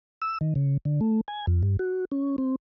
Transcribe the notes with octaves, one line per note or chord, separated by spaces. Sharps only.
E6
D#3
C#3
D3
A3
G#5
F2
G2
F#4
C#4
C4